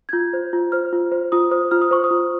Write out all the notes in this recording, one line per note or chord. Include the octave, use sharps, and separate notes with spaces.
G#6
F4 G6
C5
F4
C5 F6
F4
C5
F4 D#6
C5 D#6
F4 F6
D#6
C5 C#6
D#6
F4